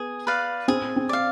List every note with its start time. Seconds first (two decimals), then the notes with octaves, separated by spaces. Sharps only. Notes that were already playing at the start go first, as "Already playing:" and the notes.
Already playing: B3 G#4
0.27 B4 D5 F5
0.68 C4 G#4
0.96 C4
1.09 D5 F5